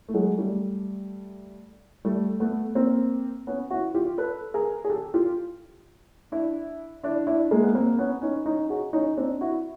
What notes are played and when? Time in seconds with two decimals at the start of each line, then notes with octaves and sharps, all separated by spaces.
0.08 A3
0.14 F#3 G#3
0.38 G3 A3
2.05 G3 A3
2.40 A3 B3
2.75 A#3 C4
3.47 B3 C#4
3.70 E4 F#4
3.94 F4 G4
4.18 A4 B4
4.54 G#4 A#4
4.85 G#4
4.90 G4 A4
5.14 F4 G4
6.32 D4 E4
7.03 D4 E4
7.27 D4 E4
7.51 G#3 A#3
7.63 B3
7.75 A#3 C4
7.99 B3 C#4
8.22 C#4 D#4
8.46 C#4 D#4
8.70 F#4 G#4
8.93 C#4 D#4
9.17 C4 D4
9.41 E4 F#4